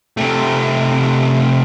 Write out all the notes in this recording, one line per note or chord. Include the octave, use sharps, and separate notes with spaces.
C3 A3